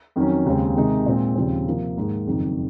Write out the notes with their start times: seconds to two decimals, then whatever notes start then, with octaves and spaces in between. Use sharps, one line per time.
0.16 F2 D#3 F#3 C#4
0.46 D#2 C#3 G#3 C4
0.76 C3 D#3 G#3 D#4
1.06 A#2 G#3 C4
1.36 D#2 C#3 F3 C4
1.67 C3 F3 A#3
1.97 G#2 D#3 A#3
2.27 F#1 F2 D#3